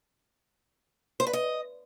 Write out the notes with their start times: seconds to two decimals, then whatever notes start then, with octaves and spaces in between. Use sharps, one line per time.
1.20 C5
1.27 B4
1.33 D#5